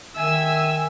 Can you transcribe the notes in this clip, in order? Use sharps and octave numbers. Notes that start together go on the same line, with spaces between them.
D#3 E5 G#5 E6